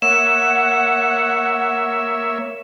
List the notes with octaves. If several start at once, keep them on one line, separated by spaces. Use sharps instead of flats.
A#3 C#5 E5 F#5 E7